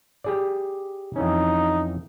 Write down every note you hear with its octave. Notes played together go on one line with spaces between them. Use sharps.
G4 G#4 D5
F2 E3 C#4 D#4